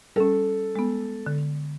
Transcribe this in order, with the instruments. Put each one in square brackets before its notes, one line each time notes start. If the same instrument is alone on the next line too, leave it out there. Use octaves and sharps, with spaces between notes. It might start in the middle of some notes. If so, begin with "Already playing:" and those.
[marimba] G3 C#4 [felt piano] A4
[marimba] G#3 B3
D3